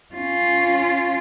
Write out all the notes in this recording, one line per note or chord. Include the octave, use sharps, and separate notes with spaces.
C#4 F4